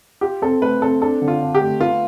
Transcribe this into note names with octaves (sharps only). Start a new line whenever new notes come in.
F4 G4
C4 A4
A3 B4
C4 A4
D4 A4
D3
F4
D4
G4
A3
B3 F4